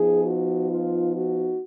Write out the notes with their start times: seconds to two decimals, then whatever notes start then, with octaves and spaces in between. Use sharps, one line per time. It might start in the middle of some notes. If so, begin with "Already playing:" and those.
Already playing: F3 B3 D#4 G#4
0.24 F#4
0.69 F4
1.14 F#4